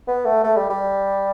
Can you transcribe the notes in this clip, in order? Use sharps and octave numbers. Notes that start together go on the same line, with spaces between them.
B3
A3
A3
G3
G3